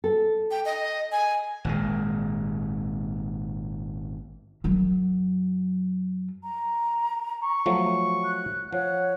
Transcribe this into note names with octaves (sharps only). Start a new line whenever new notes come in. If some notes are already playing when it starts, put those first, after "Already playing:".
A4
G5
D#5
G#5
G#1 A#2 G#3
F#2 F#3
A#5
C#6
F3 F#3 A3
F#6
F3 C#5 F#5